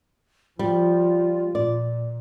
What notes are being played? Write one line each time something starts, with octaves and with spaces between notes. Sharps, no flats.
F3 G3 F4
A#2 D5